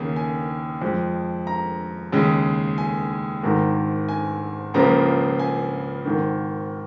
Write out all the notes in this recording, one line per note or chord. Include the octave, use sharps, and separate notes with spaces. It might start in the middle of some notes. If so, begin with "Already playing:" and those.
Already playing: D#2 C#3 A#3
G#5
F2 F3 G#3
A#5
D#2 C#3 G#3
G#5
G#1 G#2 D#3 G#3 A#5
G#5
C#2 C#3 F3 A#3 A#5
G#5
G#1 G#2 D#3